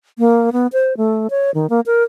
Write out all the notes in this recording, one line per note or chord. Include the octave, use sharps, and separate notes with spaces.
A#3
B3
C5
A3
C#5
D#3
A#3
A#4